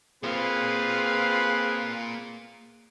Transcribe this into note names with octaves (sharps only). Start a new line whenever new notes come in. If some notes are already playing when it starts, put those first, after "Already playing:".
A#3 C4 F4 G#4 B4 F5